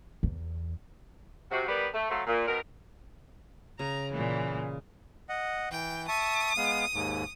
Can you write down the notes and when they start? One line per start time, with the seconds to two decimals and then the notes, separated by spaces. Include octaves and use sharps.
0.23 E2
1.52 C3 F#4
1.68 G3 B3 A#4 B4 D5
1.94 A3
2.10 F#3 A3 A4 C5 F5
2.27 A#2
2.48 B2 D#3 A#4
3.79 C#3 A#5
4.13 A#2 E3
5.29 D#5 F#5
5.72 E3 G5
6.08 E5 A5 C#6 D#6
6.57 G#3 B3 F5
6.93 D#2 G#2